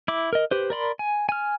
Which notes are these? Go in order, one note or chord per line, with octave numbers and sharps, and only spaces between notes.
E4 D6
A#4 D#5
G4 B4 C5
A#4 D5 B5 C6
G#5
G#5 F6